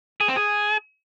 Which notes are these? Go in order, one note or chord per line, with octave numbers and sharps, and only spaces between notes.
G#4
C4
G#4